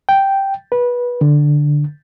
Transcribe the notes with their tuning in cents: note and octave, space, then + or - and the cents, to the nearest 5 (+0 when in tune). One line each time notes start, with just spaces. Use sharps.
G5 -5
B4 -20
D3 +5